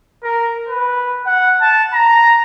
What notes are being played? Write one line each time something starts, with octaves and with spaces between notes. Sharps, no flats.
A#4
B4
F#5
A5
A#5